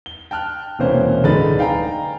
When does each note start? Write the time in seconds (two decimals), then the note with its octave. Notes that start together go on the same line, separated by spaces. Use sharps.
0.06 G7
0.31 G5 A5 F6 F#6
0.79 E1 C3 E3 A#3 C#4 C5
1.23 D1 D3 G#3 D#4 B4 A6
1.59 F5 G5 G#5 A#5